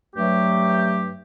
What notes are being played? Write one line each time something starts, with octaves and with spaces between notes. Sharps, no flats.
G2 F#3 A3 G4